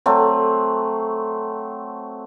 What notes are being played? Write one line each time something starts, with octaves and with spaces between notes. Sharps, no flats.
F#3 A3 C4